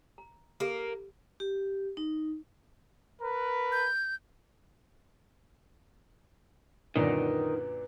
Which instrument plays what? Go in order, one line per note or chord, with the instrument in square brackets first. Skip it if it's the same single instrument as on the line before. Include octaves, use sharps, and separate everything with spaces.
[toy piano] A#5
[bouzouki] A#3 [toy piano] G4 A4
[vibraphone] G4
D#4
[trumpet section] A#4 B4
[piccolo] G6
[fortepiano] F#2 A#2 D3 [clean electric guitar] D#3 [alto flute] B4